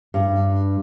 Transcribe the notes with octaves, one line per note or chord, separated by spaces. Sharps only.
G2